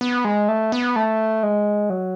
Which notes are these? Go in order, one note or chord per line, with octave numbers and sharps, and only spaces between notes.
B3
G#3
A3
B3
A3
G#3
F#3